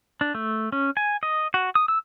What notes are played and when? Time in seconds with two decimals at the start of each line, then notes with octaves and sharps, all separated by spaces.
0.21 D4
0.35 A3
0.72 C#4
0.97 G#5
1.23 D#5
1.54 F#4
1.75 D#6
1.88 E6